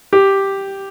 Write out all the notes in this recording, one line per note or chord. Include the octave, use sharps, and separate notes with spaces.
G4